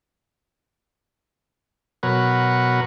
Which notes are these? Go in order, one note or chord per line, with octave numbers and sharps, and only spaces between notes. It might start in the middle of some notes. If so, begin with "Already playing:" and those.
B2 F#3 A#4 B4 C#5 F#5